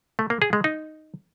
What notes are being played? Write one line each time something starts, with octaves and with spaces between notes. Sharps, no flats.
A3
A#3
G#4
G#3
D#4